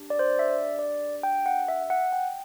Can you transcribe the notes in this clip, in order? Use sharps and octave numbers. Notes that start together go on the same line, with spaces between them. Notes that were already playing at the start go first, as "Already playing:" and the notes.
Already playing: D4 G4
D5
C5
E5
D5
D5
G5
F#5
E5
F#5
G5